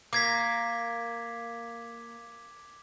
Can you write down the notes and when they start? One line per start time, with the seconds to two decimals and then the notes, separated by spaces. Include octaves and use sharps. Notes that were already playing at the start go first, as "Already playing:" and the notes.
0.13 A#3 D6 G#6 B6